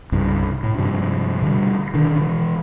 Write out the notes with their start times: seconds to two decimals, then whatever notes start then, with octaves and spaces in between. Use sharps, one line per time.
0.12 C2 G2 C#3
0.63 A2
0.78 G2 C3 F3
1.42 B2 D3 F#3 G3
1.94 B2 D3 D#3 D4
2.17 B2 E3